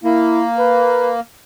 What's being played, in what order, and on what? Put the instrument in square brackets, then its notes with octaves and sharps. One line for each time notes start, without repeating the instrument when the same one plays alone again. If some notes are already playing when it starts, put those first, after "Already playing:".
[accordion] A#3 [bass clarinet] E4
[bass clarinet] B4